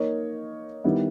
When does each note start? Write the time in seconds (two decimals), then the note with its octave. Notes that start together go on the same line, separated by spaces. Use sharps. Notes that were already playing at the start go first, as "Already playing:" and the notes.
Already playing: A#3 D#4 A#4 C#5
0.84 D#3 G3 B3 E4